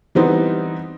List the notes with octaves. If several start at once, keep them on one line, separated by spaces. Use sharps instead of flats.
E3 G3 B3 C4 D#4